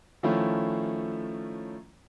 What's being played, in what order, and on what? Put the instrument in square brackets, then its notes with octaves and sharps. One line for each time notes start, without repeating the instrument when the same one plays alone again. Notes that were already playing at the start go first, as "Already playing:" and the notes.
[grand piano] D#3 F3 A3 C#4 E4 F4